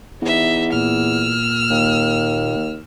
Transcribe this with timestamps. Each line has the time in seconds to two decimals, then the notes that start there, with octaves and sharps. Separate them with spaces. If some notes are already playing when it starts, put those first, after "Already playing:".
0.22 E2 D#4 E5
0.73 A#2 E6 F6
1.70 D#2